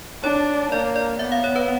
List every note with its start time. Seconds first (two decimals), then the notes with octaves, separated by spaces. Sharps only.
0.23 D4 C#5
0.72 A#3 D5
0.96 D5
1.19 B3 E5
1.32 F5
1.44 C#5
1.56 B4